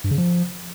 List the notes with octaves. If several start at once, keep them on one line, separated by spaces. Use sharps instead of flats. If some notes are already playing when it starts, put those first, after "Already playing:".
G2
C#3
F3